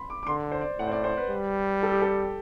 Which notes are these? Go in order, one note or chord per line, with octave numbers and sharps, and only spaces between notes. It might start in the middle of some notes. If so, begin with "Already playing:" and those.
Already playing: B5 C6
D6
D6
D3 C6
C5
D5
A2 F#5
C5
D5
C5
B4
G3
A4
G4
A4